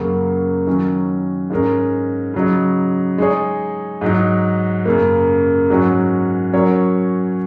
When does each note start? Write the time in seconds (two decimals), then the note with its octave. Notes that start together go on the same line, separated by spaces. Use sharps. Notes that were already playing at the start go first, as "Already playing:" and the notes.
Already playing: F#2 C#3 F#3 A#3 F#4
0.67 D#3 F#3 C#4 A#4
1.50 G#2 G#3 C#4 A#4
2.34 C#3 F#3 D#4
3.18 G#3 D#4 G#4 C#5
4.01 G#2 F#3 D#4
4.85 F#2 C#3 A#3
5.70 G#2 F#3 C#4 F#4
6.53 F#3 C#4 F#4 A#4 C#5